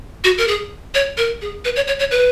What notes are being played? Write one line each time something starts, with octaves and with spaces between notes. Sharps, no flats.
F#4
A#4
G#4
C#5
A#4
G#4
B4
C#5
C#5
C#5
B4